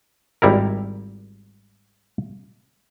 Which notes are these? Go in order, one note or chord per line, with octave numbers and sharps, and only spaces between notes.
G#1 G3 E4 A#4